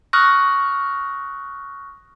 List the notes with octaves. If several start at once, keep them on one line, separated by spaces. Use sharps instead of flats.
C#6 D#6 F6 F#6 A#6